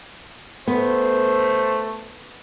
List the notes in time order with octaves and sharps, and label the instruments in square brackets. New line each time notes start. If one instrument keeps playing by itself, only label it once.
[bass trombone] A3 [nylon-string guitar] B3 [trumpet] C5